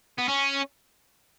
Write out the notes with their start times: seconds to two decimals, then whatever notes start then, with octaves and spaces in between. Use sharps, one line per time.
0.18 B3
0.28 C#4